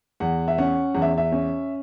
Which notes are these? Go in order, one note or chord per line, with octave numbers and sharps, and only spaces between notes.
E2 F#5
E5
C#4 F#5
E2 F#5
E5
E5
C#4